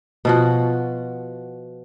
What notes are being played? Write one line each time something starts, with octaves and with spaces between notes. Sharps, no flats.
B2 F3 F#4